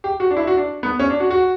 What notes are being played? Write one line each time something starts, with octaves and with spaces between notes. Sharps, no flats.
G4
F#4
D4
E4
F#4
D4
B3
C#4
D4
F#4
F#4